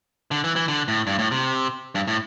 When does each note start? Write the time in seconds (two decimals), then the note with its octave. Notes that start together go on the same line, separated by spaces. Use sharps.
0.31 D3
0.44 E3
0.56 E3
0.68 D3
0.88 A2
1.07 G2
1.19 A2
1.31 C3
1.95 G2
2.07 A2